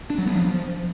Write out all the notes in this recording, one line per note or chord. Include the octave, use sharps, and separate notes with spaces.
D4
F#3
B3
F3